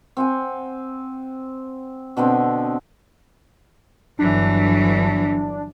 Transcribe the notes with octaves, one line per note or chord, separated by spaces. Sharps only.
C4 F#5 G#5
B2 D3 B3 C4
G1 E3 F#3 D4